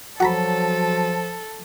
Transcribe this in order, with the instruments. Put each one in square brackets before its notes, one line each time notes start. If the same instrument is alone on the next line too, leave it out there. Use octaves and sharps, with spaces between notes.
[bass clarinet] F3 [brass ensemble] F#3 [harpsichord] F#4 A#5 B5 [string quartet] A4